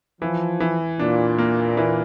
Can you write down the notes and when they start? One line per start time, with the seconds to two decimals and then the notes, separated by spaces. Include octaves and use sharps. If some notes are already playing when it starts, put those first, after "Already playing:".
0.21 E3 F3
0.60 E3
0.99 A#2 D4
1.38 A#3
1.77 E3